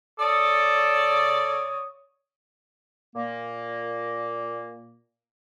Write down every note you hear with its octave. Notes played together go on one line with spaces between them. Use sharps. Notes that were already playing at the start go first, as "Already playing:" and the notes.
A4 C#5 D5 D#6
A#2 A#3